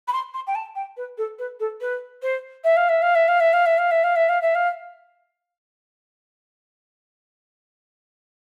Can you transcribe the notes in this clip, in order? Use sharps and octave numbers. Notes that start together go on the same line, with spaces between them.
B5
C6
C6
G5
A5
G5
B4
A4
B4
A4
B4
C5
E5
F5
E5
F5
E5
F5
E5
F5
E5
F5
E5
F5
E5
F5
E5
F5